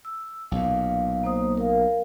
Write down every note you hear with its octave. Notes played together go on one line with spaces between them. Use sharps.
E6
B1 A#2 F5
A#3 C5 D#6
A#4 F5